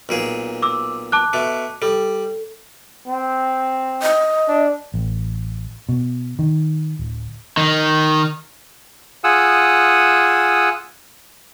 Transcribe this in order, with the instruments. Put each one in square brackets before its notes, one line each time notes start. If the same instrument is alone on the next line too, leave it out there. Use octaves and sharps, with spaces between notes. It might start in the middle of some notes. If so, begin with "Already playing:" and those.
[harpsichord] B1 A#2 G#4
[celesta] D6 E6
A5 D6 F#6
[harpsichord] B2 A3
[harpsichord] G3 [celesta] A4
[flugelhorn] C4
[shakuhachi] D#5
[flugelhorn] D4
[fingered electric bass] A1
B2
D#3
D1
[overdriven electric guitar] D#3
[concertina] F4 G#4 F#5 D#6 E6